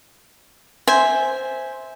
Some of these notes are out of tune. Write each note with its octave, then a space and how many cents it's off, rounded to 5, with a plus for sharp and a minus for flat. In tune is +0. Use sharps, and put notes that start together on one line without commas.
C5 +0 E5 -10 G#5 +0